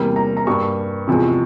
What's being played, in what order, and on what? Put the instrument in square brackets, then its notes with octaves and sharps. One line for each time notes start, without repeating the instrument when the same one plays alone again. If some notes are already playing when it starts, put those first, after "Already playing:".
Already playing: [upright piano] E2 C3 G3 A#3
A#5
A#5
G2 G3 A#3 C#6
E2 C3 F3 G#3